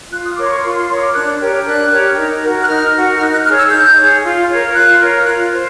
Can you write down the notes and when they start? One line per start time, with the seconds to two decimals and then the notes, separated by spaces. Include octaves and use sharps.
0.12 F4 F#6
0.25 D#6
0.37 A#4 C#5 D6
0.46 C6
0.51 C#6
0.63 F4 C6
0.76 C6
0.89 A#4 C#5 C6
0.96 D#6
1.02 D6
1.14 D4 F#6
1.40 G4 A#4 C#5
1.66 D4 F#6
1.91 G4 A#4 C#5
2.18 D#4
2.43 F#4 A#4
2.61 F#6
2.68 D#4 F6
2.94 F#4 A#4
3.16 F6
3.20 D#4 F#6
3.32 F#6
3.45 G#4 C#5 F6
3.58 E6
3.71 D#4 G6
3.97 G#4 C#5
4.23 F4
4.49 A#4 C#5
4.74 F4 F#6
4.99 A#4 C#5
5.25 F4 F#6
5.52 C5